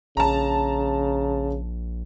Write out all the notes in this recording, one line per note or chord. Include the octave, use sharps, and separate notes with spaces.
A#1 C#3 A5 A#5